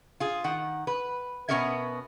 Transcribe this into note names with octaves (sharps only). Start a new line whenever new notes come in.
F4 G#4
D#3 F#5
B4
B2 B3 C#4 G#4 A#4 E5